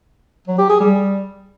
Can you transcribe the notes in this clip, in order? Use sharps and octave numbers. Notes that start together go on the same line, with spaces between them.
F#3
G4
G#4
G3